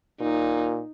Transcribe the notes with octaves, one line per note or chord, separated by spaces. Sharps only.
A#2 D#4